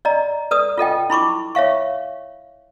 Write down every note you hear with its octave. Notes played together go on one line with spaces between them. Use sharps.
D5 D#5 A#5
A4 B4 D5 D#6
F4 A4 D#5 G5
E4 B5 C#6 D6
C#5 E5 F5 C#6